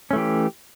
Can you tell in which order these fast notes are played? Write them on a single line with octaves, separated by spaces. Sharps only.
C#4 A3 E3 G4